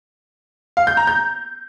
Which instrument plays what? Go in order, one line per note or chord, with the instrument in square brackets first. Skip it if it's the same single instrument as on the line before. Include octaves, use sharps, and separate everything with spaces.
[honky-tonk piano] F5
G6
A#5
G6